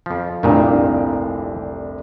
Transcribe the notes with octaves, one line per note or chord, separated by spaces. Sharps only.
F2 F3
F1 C2 G2 A#2 D#3 D4